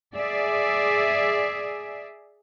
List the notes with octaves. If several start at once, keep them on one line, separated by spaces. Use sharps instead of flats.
G#4 D5 E5